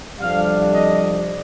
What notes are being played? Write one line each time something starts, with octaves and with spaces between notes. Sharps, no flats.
F2 C3 G3 D4 F5
D#5